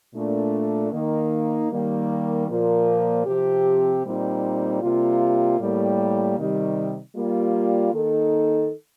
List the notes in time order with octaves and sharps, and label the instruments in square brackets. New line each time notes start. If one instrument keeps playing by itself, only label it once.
[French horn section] A#2 A3 D4
D#3 A#3 D#4
D#3 G3 A#3
A#2 F3 A#3
C3 F3 C4 G4
A#2 G3 C4 D#4
C3 G3 A#3 F4
A2 G3 A#3
C3 D#3 G3
G3 A#3 F4
D#3 A#3 D#4 A4